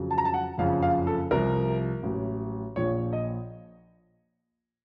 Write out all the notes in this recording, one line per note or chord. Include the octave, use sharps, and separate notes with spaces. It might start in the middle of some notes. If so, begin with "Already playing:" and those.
Already playing: F2 C#3 F#3
A5
A#5
A5
F#5
F#1 F2 C#3 F3 F5
F5
A4
C2 C3 F3 A#4
A1 A2 F#3
A#1 A#2 F3 C#5
D#5